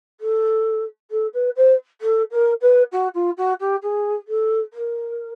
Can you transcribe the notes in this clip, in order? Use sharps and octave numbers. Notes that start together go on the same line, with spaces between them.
A4
A4
B4
C5
A4
A#4
B4
F#4
F4
F#4
G4
G#4
A4
A#4